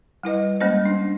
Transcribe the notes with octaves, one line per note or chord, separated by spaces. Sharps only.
G3 E4 B4 D#5
G3 G#3 A#3 C#4 C5 D#5
D4